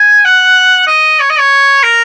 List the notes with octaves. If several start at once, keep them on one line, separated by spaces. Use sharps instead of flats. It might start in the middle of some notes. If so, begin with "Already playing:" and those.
Already playing: G#5
F#5
D#5
C#5
D#5
C#5
A#4